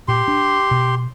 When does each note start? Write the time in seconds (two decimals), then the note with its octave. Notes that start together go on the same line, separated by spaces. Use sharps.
0.08 A#2 G4 C6
0.28 D4
0.71 B2